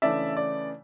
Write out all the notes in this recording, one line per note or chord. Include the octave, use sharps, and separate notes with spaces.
C#3 E3 A3 D4 D5 E5
D5